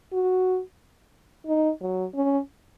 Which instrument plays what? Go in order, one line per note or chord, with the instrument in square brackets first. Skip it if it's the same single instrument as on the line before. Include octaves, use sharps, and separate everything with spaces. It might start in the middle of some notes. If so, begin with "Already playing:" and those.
[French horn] F#4
D#4
F#3
C#4